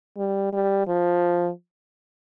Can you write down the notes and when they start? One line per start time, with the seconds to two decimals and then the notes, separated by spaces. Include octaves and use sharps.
0.17 G3
0.53 G3
0.87 F3